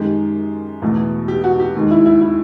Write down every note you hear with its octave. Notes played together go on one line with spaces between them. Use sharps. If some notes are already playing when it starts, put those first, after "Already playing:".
Already playing: F#2 D#3 G#3 G4
E2 B2 F#3 A3
G4
F#4
G4
D#2 D#3 G#3
E4
E4
E4